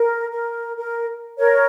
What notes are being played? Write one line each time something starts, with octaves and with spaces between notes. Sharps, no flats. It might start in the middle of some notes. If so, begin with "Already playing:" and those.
Already playing: A#4
A#4
A#4
A#4 C#5